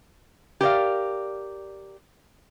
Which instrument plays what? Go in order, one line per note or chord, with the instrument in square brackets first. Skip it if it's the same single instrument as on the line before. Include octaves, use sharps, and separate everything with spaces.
[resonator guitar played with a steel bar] G4 A#4 D5 F5